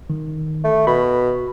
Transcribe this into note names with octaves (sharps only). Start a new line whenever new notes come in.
D#3
A3
B2 B5